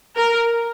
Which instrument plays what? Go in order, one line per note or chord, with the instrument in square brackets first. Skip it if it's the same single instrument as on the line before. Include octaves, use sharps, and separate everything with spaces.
[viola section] A#4